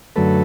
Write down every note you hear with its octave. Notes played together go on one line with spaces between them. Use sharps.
F#2 D3 F#3 A3 A4 B4